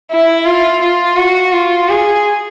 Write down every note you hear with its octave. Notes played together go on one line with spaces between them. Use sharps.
E4
F4
F4
F#4
F4
G#4